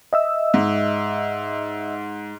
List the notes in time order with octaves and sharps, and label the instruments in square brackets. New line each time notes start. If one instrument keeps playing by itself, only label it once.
[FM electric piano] D#5 E5 E6
[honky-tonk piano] G#2